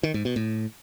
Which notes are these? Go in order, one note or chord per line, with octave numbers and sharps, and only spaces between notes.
D#3
G#2
B2
A2